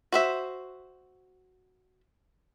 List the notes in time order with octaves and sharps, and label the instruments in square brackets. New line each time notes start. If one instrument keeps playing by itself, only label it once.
[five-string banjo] F#4 C5 E5